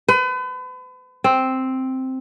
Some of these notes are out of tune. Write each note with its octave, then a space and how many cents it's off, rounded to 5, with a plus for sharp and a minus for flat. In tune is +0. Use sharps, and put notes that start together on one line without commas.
B4 +40
C4 +0